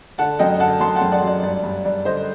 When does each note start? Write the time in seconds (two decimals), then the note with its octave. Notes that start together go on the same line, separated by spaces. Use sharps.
0.18 D3 F#5 A5
0.39 F#2 D#5 G5
0.60 D3 F#5 A5
0.80 F#2 A5 C6
0.96 F#5 A5
1.01 F#2
1.12 D5 F#5
1.22 F#2
1.27 D5
1.43 G2 D5
1.63 G2
1.85 G2 D5
2.05 D3 C5 D#5